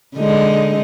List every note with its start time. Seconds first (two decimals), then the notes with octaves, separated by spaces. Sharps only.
0.16 D3 G#3 D#4